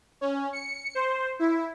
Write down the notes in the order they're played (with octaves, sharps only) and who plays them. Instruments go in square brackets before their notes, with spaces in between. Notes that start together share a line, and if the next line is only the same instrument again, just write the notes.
[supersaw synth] C#4
C#7
C5
E4